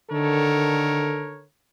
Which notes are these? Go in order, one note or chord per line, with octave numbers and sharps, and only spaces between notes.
D3 D#3 A4 A#4 C#5